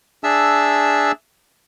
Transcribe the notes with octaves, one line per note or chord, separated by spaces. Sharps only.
D4 G#4 E5 A5 E6